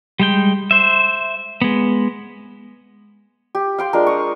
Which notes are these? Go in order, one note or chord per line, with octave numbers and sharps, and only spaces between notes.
G3 G#3 G5
C5 E5
G#3 B3
G4
F5 G5 C6
G#3 D4 F4 A#4
C#6 D#6